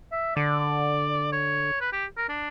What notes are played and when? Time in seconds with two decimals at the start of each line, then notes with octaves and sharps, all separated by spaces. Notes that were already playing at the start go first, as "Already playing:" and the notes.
0.12 E5
0.36 D3 D5
1.32 C#5
1.81 B4
1.92 G4
2.17 A#4
2.29 D4